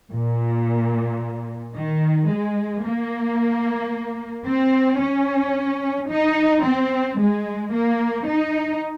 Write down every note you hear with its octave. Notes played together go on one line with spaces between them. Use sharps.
A#2
D#3
G#3
A#3
C4
C#4
D#4
C4
G#3
A#3
D#4